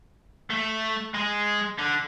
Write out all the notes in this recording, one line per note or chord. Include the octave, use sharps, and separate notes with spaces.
A3
G#3
D3